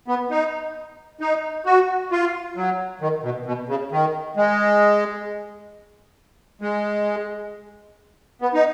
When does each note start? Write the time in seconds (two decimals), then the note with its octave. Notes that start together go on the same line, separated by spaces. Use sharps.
0.08 B3
0.31 D#4
1.21 D#4
1.66 F#4
2.12 F4
2.56 F#3
3.01 D#3
3.23 B2
3.46 B2
3.69 C#3
3.92 D#3
4.37 G#3
6.62 G#3
8.42 B3
8.54 D#4